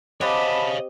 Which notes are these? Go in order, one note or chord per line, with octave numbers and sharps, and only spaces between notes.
C4 G4 C#5 D#5 F5 F#5 A5 B5